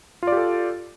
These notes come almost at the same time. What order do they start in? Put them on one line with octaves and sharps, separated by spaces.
F4 D5 G4 A4